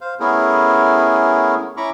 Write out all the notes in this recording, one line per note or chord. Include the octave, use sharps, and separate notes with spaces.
C5 F5
A3 B3 C#4 E4 G#4 A#4
C#4 E4 A#5 B5 C#6 D6